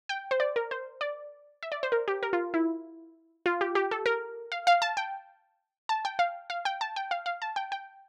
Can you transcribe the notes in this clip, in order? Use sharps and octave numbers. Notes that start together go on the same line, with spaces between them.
G5
C5
D5
A#4
C5
D5
E5
D5
C5
A#4
G4
A#4
F4
E4
F4
G4
G4
A4
A#4
F5
F5
A5
G5
A5
G5
F5
F5
G5
A5
G5
F5
F5
A5
G5
G5